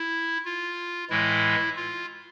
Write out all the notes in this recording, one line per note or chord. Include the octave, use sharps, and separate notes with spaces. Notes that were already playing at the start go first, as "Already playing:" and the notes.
Already playing: E4
F4
A2 E3 G#3 E4
F4